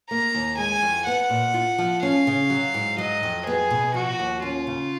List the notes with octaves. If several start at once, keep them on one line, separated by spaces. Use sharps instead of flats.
A#3 A#5
D#2
G#3 G#5
F2
B3 F#5
A#2
F4
F3
C#4 F5
C#3
F#3
G#2
F#3 D#5
F2
B3 G#4
B2
F3 F#4
D#2
C#4 F4
C#3